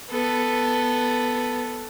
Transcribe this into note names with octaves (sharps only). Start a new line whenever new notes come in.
B3 A4